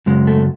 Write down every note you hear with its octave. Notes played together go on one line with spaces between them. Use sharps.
F#2 C#3 G#3
A3